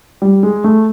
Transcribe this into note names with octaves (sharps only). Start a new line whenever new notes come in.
G3
G#3
A3